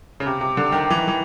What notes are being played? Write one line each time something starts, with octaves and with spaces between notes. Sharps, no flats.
C#3
C3
C3
D3
D#3
E3
D#3
E3